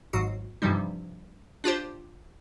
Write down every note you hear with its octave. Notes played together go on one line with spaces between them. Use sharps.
G#1 G#2 F#3 F#4 C7
G2 C3 E3 F3 G3 D#4
D4 F4 G4 C5